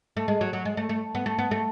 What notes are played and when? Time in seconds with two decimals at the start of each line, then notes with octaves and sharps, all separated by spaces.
0.17 A3
0.28 G#3
0.41 F#3
0.53 F#3
0.65 G#3
0.77 A3
0.89 A3
1.15 B3
1.26 A3
1.39 B3
1.51 A3